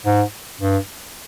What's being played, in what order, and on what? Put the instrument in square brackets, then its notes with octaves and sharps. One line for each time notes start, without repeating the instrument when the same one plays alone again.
[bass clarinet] G#2
G2